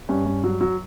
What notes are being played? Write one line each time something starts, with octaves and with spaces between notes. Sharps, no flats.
G2 C#4
G2
F#3
F#3